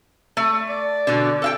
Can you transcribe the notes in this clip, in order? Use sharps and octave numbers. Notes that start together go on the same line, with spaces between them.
A3
D5
B2 D3
A4 F5 G5